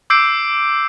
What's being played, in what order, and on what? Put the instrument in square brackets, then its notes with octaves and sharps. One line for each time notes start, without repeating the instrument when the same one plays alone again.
[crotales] D6 E6 G6 C7 D7